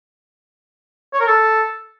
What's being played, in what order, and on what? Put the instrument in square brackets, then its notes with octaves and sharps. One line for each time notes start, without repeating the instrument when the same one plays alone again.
[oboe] C#5
A#4
A4